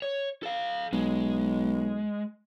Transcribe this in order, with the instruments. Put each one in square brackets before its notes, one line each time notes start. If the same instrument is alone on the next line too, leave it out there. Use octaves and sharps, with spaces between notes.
[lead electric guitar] C#5
A4 F5
[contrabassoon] B1 [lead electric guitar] G#3